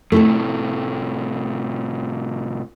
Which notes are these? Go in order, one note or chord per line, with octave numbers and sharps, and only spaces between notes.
A2 C3 A3 E4 A4